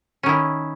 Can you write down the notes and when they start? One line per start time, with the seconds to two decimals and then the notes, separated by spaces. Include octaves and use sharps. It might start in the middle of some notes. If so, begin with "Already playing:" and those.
0.23 C#4
0.26 D#3
0.29 E4